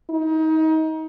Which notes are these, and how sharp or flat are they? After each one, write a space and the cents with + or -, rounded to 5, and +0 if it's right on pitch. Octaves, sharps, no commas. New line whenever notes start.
D#4 +30